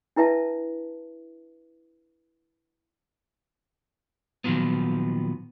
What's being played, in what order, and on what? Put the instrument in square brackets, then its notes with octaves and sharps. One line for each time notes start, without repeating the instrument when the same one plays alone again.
[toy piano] D4 E4 B4 E5 A5
[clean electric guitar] A#2 D#3 F3 F#3 B3